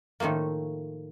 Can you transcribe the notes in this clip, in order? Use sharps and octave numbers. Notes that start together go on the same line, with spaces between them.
A2 D#3 F3 A3 A#3